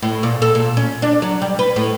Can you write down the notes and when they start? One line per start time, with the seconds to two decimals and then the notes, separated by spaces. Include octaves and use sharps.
0.02 A2
0.23 A#2
0.42 A4
0.55 A#2
0.77 C#4
1.02 D4
1.22 F#3
1.42 G3
1.59 B4
1.76 A2